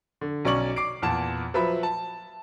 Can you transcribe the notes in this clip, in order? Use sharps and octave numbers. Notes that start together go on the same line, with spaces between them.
D3
B1 C#4 D5 C#6 F#7
D6 C7 D7
E2 A#2 A5 E7
F3 F#3 B4 E5 B5
A5